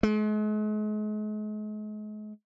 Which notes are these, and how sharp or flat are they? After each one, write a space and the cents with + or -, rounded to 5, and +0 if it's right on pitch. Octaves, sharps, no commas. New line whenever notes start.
G#3 +40